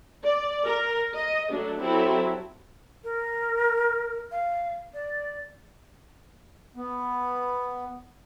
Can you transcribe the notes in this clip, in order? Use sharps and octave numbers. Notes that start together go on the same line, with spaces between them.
D5
A#4
D#5
F#3 A3 D4
F#3 C4 E4 G4 A4
A#4
F5
D5
B3